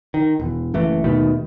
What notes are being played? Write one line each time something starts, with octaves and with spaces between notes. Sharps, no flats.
D#3
E1
F#1 E3 A3
D#2 B2 D#3 A3